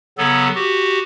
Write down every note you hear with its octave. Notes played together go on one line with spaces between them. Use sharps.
C#3 F#3 B3 A4
F#4 G4